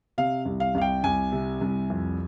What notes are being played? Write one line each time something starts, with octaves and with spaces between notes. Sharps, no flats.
C3 F5
C2
F5
C2 F5
G5
C2 G#5
C3
C2
F2